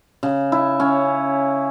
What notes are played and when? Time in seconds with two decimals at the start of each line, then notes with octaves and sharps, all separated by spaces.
0.23 C#3
0.52 E4
0.80 C#4